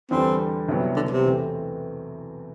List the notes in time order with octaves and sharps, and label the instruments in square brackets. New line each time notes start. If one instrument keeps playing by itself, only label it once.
[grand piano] E2 D3 G3 [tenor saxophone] C4
[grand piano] C2 C3 F#3 B3
[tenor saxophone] D3
C3
[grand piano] E2 B2 A3 C4